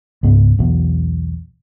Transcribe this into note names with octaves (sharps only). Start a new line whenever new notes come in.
C#2 G#2 B3
B1 E2 B2